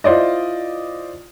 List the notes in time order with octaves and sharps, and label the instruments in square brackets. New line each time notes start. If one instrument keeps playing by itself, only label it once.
[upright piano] E4 F4 C5 D5 D#5